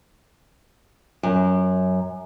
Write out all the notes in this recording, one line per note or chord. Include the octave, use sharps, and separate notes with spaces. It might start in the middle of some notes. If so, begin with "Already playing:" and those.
F#2